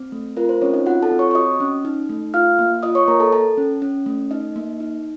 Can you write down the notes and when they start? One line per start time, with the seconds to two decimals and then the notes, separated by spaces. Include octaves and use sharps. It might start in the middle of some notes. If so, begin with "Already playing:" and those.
Already playing: C4
0.12 A3
0.37 F4 A#4
0.49 C5
0.61 C4 C#4 C#5
0.74 D#4 D#5
0.86 F4 F#4 F#5
1.03 A4 A5
1.11 C4
1.19 C#5 C#6
1.31 C#6
1.35 F#4 D#5 D#6
1.60 C#4
1.85 D#4
2.10 A3
2.34 F4 F5 F6
2.59 A#3
2.83 F4 D#5 D#6
2.95 C#5 C#6
3.08 A#3 A#4 A#5
3.20 A4 A5
3.32 A4 A5
3.58 C#4
3.82 C#4
4.06 A3
4.31 D#4 D#5
4.56 A#3
4.80 D#4